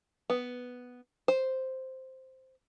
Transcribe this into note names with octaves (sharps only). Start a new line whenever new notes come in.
B3
C5